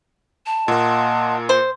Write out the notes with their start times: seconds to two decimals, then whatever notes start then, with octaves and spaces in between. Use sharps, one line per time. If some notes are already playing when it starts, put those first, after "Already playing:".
0.46 A5
0.68 A#2 A#3 F4 D#5 F#5
1.49 C5